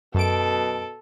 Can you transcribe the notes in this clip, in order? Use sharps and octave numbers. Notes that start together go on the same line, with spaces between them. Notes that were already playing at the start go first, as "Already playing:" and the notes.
F#2 B2 A4 D7